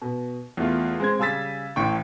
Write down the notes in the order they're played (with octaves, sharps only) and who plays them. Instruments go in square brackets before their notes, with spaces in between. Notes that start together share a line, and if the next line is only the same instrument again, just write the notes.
[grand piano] B2
E2 A3 F4
G#3 C4 G#6
C#3 G3 G#5 E6 A6 B6
A1 A2 G5 C#6